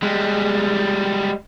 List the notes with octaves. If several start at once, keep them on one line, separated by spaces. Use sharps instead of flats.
G3 G#3